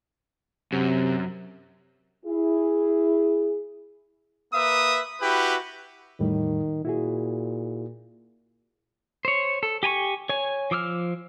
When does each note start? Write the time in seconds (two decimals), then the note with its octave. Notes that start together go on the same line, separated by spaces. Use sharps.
0.72 F#2 C3
2.25 E4 G#4
4.53 A#3 B4 E5 D#6
5.21 E4 F#4 G4 B4
6.20 E2 A2 D#3 G3
6.85 A#2 E4 F#4 G#4
9.25 C5 C#5
9.63 A4
9.83 G4 G#5 A#5 C#6
10.29 C#5 G#5
10.71 F3 D6 E6 F6